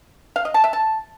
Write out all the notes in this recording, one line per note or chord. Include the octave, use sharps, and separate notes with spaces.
F5
D#5
A5
E5
A5